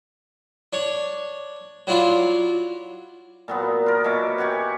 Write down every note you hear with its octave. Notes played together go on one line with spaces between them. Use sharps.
D4 C#5
F#3 D4 E4 F4 E5
A#2 F#3 B3
F4 A#4
B2 C#5 E5 D6
G4 C#5 F#5 G#5